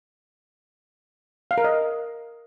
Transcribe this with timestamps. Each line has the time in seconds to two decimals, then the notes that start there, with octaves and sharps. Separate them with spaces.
1.51 F5
1.58 A#4
1.64 D#5